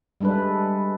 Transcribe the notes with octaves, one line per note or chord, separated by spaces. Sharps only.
G3 G#3 D4 A4 B4